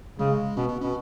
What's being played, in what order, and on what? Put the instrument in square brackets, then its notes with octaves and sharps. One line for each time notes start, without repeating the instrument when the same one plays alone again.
[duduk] C#3 [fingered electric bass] G#3
[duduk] B2 [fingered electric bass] C#4
[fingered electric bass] B3
[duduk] B2 [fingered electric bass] C#4